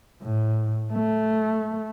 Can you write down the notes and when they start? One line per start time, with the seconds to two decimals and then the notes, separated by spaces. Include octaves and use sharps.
0.22 A2
0.93 A3